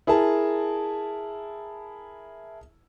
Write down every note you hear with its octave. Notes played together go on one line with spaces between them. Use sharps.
E4 G#4 A#4 A5